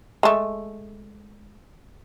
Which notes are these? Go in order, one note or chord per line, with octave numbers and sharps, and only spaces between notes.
G#3 A3